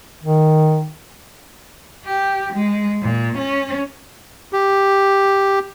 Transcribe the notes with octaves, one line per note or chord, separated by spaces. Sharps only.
D#3
G4
G#3
A#2
C#4
G4